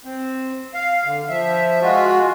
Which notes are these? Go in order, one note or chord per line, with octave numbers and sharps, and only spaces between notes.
C4
F5
D3
F3 E5
G#3 F4 F#4